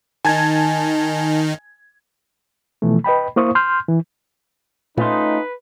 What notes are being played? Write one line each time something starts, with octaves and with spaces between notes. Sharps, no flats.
D#3 D#4 G#5 A5 G#6
B2 E3 F3 A3
B4 D#5 G5 B5
A#3 E4 C5 F5 C#6 D#6
C6 F6 G6
E3
A#2 A3 C#4 D#4 F4 B4